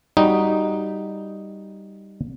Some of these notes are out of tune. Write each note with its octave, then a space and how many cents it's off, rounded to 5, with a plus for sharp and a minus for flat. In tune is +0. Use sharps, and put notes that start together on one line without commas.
G3 +0 D#4 +0 F#4 +0